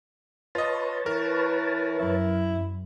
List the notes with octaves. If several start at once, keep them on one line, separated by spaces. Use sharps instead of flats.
F4 B4 C#5 D#5 A5
E3 A#4
F#2 E4